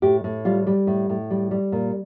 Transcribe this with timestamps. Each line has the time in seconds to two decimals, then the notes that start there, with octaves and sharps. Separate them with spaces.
0.02 A2 G4
0.24 A2
0.45 G3 F4
0.67 G3
0.87 A2
1.10 A2
1.30 G3
1.51 G3
1.72 A#2